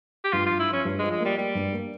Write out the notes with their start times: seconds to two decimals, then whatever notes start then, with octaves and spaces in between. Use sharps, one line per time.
0.24 G4
0.33 G2 F4
0.46 G2 F4
0.60 E4
0.69 F3 C#4
0.85 G2
0.99 G#3
1.03 F3
1.11 G#3
1.20 A#3
1.25 G3
1.38 G3 A#3
1.55 G2
1.73 A#3